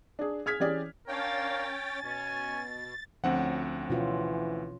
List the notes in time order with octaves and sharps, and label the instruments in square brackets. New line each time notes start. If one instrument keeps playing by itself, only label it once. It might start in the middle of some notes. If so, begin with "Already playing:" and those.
[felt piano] D4 G#4
G#4 F6 G#6 B6
E3 C#4 G4 G#4 D5
[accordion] C#4 C#5 G5 [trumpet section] D4 F5 [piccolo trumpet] A#4 [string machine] A6
[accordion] B2 [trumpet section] C#4 [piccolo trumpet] G#5
[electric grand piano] D2 C4 F#5 [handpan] F3 C#4
[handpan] B2 C#4 F4 [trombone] E3